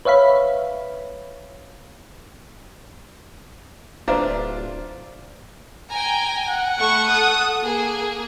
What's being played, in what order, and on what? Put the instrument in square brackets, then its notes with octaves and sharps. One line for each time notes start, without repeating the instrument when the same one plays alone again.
[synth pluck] B4 C#5 E5 F5 B5
[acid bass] D1 [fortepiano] D4 F4 [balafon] B4 D5 A#5 [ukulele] C5 E5
[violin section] G5 G#5 A#5
[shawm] F#5
[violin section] A3 B5 C#6
A4 D#6
A#3 G#4